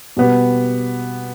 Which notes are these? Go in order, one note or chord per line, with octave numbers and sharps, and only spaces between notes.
B2 G3 B3 G4